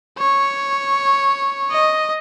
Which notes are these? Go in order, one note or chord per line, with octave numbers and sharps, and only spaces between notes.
C#5
D#5